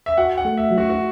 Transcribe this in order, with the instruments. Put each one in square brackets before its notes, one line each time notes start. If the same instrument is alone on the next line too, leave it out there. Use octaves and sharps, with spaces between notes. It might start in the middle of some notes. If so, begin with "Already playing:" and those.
[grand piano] E5
[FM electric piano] F#4 [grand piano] F#5
[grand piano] F#5
[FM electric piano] A3
[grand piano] E5
[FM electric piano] F#3
[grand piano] F#4
F#4